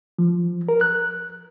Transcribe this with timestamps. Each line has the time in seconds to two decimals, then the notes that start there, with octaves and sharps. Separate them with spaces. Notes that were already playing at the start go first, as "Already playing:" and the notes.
0.19 F3
0.69 A#4
0.81 F#6